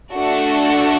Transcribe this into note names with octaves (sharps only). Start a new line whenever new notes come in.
A3 D4 F#4 A4